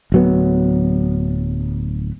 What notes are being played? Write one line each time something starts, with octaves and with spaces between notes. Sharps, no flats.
D1 F#3 B3